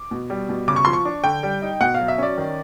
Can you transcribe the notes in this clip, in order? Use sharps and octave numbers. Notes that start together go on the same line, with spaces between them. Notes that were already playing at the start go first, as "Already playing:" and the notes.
Already playing: D6
B2
G3
B2
C#3 D6
C#6
F3 C6
C#6
D4
D3 G5
G3
D#4
B2 F#5
F5
F#3
E5
C#4 D5
D#3